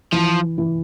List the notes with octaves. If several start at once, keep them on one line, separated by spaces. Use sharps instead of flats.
E3 F3
E3